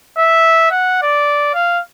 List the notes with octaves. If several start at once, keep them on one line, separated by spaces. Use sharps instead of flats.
E5
F#5
D5
F5